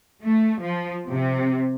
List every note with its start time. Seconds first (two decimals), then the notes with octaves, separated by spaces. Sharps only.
0.24 A3
0.60 F3
1.09 C3